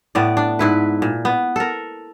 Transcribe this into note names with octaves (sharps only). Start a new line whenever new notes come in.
A2 B3 D5
D4
G#2 E4 B4
A#2
B3
A4 A#4